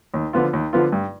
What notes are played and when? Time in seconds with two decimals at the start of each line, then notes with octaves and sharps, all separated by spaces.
0.14 D#2
0.33 D3 F3 B3 F4
0.53 D#2
0.73 D3 F3 B3 F4
0.92 G2